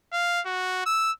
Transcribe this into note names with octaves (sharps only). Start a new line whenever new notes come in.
F5
F#4
E6